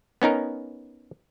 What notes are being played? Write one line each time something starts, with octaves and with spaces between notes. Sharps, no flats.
B3 C#4 D#4 A#4